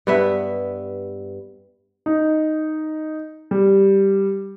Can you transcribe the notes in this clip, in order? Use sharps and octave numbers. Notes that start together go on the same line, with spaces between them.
G2 B3 E5
D#4
G3